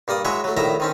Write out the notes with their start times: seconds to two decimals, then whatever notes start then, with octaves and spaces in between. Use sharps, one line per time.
0.08 G2 A#3 D5 D#6
0.25 F#3 G#3 E4 G#4 C#5
0.44 F#3 A3
0.57 A#1 A2 D#3 E4 E5 A#5
0.80 D#3 C4 C#4